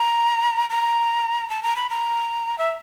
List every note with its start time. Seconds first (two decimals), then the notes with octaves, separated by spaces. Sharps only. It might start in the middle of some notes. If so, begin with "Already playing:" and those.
Already playing: A#5
0.70 A#5
1.50 A5
1.63 A#5
1.76 B5
1.90 A#5
2.58 E5